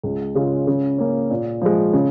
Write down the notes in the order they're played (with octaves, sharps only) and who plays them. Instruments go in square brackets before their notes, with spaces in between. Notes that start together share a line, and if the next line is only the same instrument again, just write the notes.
[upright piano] C#2
C#3 G#3 C#4 F4
C#3
A#3 C#4
A#2
F3 G#3
C#3